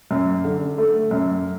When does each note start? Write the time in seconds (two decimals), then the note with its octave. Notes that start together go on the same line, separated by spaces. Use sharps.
0.11 F#2
0.45 D3
0.78 A3
1.11 F#2